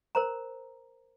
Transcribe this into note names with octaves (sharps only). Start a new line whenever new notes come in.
A#4 C5 A#5